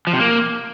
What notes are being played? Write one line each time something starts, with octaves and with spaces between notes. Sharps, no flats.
F3
C3
A#3